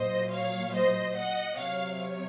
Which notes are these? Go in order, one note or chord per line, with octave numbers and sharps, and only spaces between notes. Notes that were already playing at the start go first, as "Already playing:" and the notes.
Already playing: A#2 F#3 C5 D#5
C#5 F5
C5 D#5
D#5 F#5
C3 F#3 C#5 F5
C#5